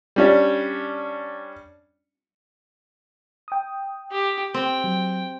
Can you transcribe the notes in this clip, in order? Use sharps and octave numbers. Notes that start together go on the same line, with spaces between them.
G3 C#4 D4
G5 D#6
G4
C4 G5
F#3